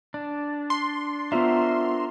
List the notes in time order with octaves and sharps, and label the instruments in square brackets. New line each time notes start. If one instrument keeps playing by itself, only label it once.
[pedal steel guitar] D4
[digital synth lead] C6
[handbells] B3 F4 E5 [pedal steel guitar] D4 A#4 C5